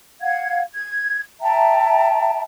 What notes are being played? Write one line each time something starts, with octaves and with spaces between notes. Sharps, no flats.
F5 F#5 G#6
G#6
E5 G5 A5 A#5